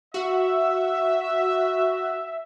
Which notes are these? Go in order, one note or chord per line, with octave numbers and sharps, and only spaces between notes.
F#4 E5